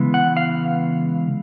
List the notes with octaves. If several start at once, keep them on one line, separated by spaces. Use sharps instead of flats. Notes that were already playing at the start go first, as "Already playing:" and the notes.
Already playing: C#3 E3 G#3 B3
F#5
F5